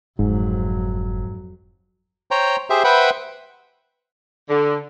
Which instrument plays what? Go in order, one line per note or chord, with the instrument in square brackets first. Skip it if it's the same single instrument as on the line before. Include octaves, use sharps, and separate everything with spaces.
[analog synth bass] F#1 [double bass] F2 F#3 [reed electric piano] G#2
[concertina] C5 C#5 G5 A#5
G4 G#4 C5 E5
B4 C5 E5 F#5 G5 B5
[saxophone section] D3